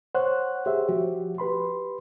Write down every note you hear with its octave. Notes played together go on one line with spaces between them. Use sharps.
C5 C#5 F#5 F#6
G4 G#4 C5 C#5 E5
F3 F#4 G4
G4 B4 B5 C6